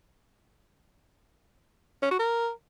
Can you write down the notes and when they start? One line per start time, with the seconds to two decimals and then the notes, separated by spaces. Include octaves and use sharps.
2.02 C#4
2.11 F#4
2.19 A#4